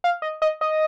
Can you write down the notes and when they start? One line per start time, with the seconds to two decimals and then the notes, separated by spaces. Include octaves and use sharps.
0.04 F5
0.22 D#5
0.42 D#5
0.61 D#5